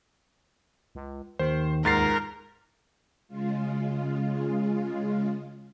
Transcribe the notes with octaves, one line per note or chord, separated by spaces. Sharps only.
C#2
D#2 D#3 C5
C#2 G#2 A#4 A6 C7
C#3 G#3 F4